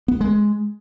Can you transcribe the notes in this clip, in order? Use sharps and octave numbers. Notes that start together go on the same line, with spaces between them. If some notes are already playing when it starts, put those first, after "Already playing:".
B3
G#3